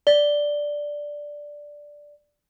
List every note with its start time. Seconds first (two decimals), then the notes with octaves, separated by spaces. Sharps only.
0.07 D5 G7